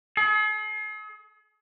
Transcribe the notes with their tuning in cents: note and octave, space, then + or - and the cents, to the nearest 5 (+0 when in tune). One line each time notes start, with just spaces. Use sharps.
G#4 +45